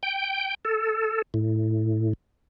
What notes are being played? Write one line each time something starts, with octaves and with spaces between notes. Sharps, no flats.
G5
A4
A2